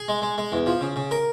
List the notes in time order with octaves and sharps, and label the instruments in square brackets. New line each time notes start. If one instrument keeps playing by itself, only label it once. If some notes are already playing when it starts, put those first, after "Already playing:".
Already playing: [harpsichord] G#4
G#3
G#3
G#3
E2
F3
C#3
C#3
A#4